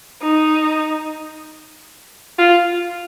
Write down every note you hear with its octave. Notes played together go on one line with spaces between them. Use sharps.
D#4
F4